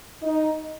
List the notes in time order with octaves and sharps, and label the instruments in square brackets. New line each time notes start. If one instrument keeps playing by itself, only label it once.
[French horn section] D#4